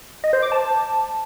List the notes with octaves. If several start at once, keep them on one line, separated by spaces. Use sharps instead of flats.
D#5
C5
D6
A5